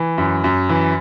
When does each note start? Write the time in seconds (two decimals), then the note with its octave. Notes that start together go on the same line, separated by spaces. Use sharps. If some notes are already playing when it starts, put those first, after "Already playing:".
Already playing: E3
0.18 F#2
0.44 F#2
0.69 E3